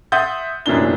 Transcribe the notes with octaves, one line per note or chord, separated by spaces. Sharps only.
E5 F#5 C6 D#6 G6 A6
F1 F#2 A#2 E3 D4 G7